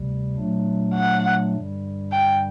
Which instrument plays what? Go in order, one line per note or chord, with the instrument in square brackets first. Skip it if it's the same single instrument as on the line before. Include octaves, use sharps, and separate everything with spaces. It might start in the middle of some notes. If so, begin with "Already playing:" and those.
Already playing: [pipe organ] D2 C3 G3
A#2 F#3 A3 D4
[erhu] F#5
[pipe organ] G2 D3 G3
[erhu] G5